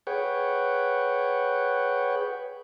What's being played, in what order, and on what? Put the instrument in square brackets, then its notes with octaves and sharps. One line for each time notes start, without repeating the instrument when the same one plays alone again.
[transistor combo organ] G#4 B4 C#5 F#5 G5